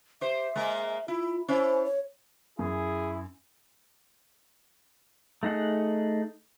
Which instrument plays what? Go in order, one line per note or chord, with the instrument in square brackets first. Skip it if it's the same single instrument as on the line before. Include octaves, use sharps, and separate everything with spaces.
[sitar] G4 C5 [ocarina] E5
[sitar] G#3 A#3 A#4
[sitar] E4 [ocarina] F4
[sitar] C#4 E4 [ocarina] C5
[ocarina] C#5
[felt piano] F#2 [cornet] E4 [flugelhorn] G#4
[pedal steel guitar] A3 D#4 G#4 F#5